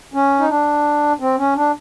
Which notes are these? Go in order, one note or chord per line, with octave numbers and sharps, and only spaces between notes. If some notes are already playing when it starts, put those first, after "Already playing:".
C#4
D#4
D4
C4
C#4
D4